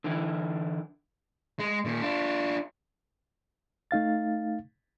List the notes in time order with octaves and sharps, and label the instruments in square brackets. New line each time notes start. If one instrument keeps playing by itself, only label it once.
[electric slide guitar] D3 E3 E4
[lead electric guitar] G#3
A#2 D#3
D4 F4
[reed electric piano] A3 D#4 F5 A6